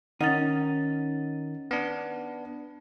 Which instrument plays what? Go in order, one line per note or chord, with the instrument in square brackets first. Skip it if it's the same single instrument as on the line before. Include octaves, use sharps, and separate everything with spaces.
[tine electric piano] D#3 [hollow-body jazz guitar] C#4 D#4 [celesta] F#5 A6
[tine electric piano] B3 D4